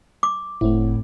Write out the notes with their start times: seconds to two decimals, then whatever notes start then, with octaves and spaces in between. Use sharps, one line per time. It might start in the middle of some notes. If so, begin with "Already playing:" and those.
0.23 D6
0.61 F#1 A2 A3 C4 E4